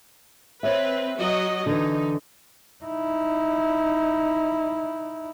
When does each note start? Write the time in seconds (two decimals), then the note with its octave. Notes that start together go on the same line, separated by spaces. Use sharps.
0.63 C4 B4 C#5 E5
1.19 F#3 F#4 D#5
1.66 D3 E3 D#4
2.84 D#4 E4